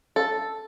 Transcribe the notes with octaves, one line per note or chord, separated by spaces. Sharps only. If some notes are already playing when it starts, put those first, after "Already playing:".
A4